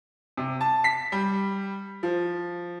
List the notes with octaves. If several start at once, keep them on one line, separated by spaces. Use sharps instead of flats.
C3
A5
B6
G3
F3